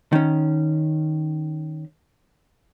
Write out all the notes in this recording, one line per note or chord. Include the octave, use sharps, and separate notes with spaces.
D#3 C#4